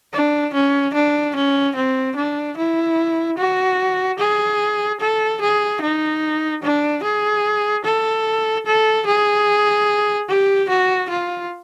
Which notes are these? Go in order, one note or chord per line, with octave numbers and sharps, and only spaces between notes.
D4
C#4
D4
C#4
C4
D4
E4
F#4
G#4
A4
G#4
D#4
D4
G#4
A4
A4
G#4
G4
F#4
F4